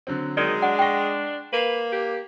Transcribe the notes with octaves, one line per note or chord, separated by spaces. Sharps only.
D3 F#3 C4
D#3 F#3 G#3 D5
D4 F#5
G5 C#6 A#6 C7
A#3 B4
G4